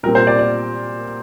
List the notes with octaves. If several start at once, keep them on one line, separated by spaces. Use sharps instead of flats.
A#2 G3 C4 A#4
C5
D5
D5